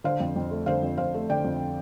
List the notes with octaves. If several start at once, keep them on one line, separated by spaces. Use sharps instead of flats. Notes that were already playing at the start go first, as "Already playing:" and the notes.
D3 C5 F5
F2
F2
A3
D3 C5 F5
F2
F2 C5 F5
A3
D3 D5 G5
F2